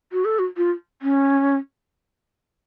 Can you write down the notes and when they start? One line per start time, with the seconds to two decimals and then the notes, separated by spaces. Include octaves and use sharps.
0.12 F#4
0.25 A4
0.39 F#4
0.57 F4
1.02 C#4